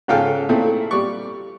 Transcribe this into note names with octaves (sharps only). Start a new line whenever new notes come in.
G#2 C#3 F4 A4 G5 F6
A#2 A3 C4 E4 A4
G3 D5 C#6